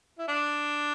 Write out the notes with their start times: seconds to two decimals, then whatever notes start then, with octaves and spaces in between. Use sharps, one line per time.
0.18 E4
0.28 D4